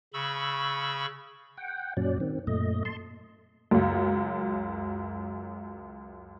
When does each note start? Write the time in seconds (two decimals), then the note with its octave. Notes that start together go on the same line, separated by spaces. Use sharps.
0.14 C#3 B5 C#6 E6
1.57 F#5 G5
1.97 F#2 A#2 F#3 C#4 D5
2.20 D#3 C4
2.47 F#2 A#2 A3 D#5
2.85 A5 C6
3.71 C#2 F#2